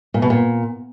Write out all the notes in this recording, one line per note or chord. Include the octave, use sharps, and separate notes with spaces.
A#2
B2
A#2